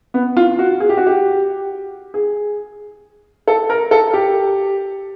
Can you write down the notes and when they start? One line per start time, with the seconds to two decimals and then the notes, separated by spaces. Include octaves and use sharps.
0.14 B3
0.37 F4
0.59 F#4
0.80 G#4
0.89 G4
0.97 F#4
1.07 G4
2.14 G#4
3.48 A4
3.70 A#4
3.91 A4
4.14 G4